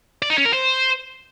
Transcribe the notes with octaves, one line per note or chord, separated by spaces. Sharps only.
D5
D#4
C#4
A#4
C5